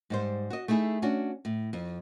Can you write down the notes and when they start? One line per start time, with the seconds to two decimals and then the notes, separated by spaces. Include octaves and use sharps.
0.10 G#2 G3 C5
0.50 F#4 D#5
0.68 A3 D#4 E4 G#4
1.02 C#4 D4 F#4
1.45 A2
1.73 F2